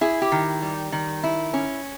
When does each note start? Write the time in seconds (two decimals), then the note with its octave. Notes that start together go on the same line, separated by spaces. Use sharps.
0.01 E4 G#4
0.22 G4
0.32 D#3
0.62 G3
0.92 D#3
1.23 E4
1.54 C#4